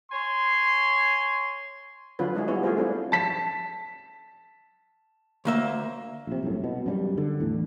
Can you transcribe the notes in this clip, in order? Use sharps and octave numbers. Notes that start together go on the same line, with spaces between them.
C#5 G#5 C6
D3 F#3 C#4 F4 B4
G#3 D4 E4 G#4
G3 B3 E4 C#5
A3 F4 G#4 C5
A3 C4 D4 E4
A5 B6
D2 A#3 E5
A#1 C3
C2 F#2 A2
B2
F#2 D3 G3
D3
E2 A2